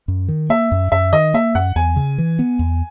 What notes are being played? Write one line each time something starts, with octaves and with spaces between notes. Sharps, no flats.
F#2
D#3
A#3 E5
F#2
F#2 E5
D#3 D#5
A#3 E5
F#2 F#5
E2 G#5
C#3
E3
B3
E2